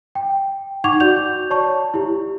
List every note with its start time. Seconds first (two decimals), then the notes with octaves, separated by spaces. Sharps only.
0.15 G5
0.84 D#4 F#5 C#6 D6 G#6 F7
1.00 F#4 D5 G6 F7
1.50 C#5 D5 A5 C#6
1.94 E4 G4